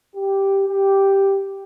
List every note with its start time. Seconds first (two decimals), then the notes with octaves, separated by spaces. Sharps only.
0.15 G4
0.67 G4